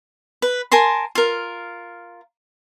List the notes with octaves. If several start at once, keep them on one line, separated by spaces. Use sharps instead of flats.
B4
A#4 G#5 A5 C6
F4 A#4